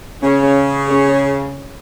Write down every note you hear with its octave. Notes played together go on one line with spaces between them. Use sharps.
C#3 C#4 G#4 C#5
C#4 G#4 C#5